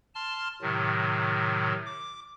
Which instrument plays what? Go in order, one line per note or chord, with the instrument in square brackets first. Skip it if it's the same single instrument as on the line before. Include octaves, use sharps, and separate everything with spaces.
[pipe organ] A5 C6 F6
A2 C3 D#3 F#3
D6